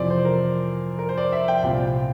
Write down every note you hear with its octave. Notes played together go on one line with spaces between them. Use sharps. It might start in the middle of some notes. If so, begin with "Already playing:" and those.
Already playing: F2 C3 E3 C5 D5
C5
A#4
A#4
C5
D5
E5
G5
C2 A#2 F3 C4 F4 G5